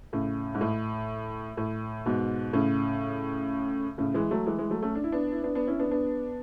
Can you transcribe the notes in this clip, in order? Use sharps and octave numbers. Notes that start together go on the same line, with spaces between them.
A2 C#3
G#2
A2
A2
G#2 B2
A2 C#3
A2 C#3
E3 G#3
F#3 A3
E3 G#3
E3 G#3
F#3 A3
A3 C#4
D4
E4
B3 D4
E4
B3 D4
B3 D4
C#4 E4
B3 D4
B3 D4